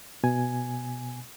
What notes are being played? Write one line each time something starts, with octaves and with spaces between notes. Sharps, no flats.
B2 G#5